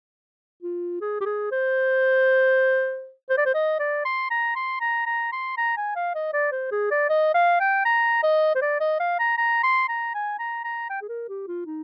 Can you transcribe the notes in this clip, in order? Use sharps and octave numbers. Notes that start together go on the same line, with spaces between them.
F4
G#4
G4
G#4
C5
C5
D5
C5
D#5
D5
C6
A#5
C6
A#5
A#5
C6
A#5
G#5
F5
D#5
D5
C5
G#4
D5
D#5
F5
G5
A#5
D#5
C5
D5
D#5
F5
A#5
A#5
C6
A#5
G#5
A#5
A#5
G5
G#4
A#4
G4
F4
D#4